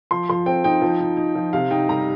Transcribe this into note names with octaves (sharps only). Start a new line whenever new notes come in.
F3 C6
F3 C6
C4 G5
D#4 G5
F3
D#4
D#4
F3
C3 F5
D#4 G5
G3 A#5